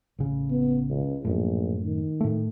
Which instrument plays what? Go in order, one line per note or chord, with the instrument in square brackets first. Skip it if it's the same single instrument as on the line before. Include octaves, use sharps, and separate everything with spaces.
[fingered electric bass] A1 C#3
[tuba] B3
C#2
[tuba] A#1 [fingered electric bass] F#2 A2
[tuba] D#3
[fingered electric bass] A2 A3